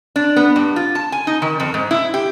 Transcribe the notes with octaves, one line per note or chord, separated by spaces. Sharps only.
D4
B3
G2
F4
A5
G#5
D#4
D#3
F2
G#2
E4
G4